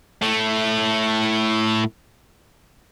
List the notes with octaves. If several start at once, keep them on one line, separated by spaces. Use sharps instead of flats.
A2 A3